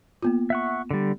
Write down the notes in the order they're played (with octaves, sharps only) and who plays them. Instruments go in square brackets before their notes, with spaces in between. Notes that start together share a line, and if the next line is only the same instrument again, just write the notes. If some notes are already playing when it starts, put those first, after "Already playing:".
[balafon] A#3 B3 F4
[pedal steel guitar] E5 F#5 C#6
D3 G3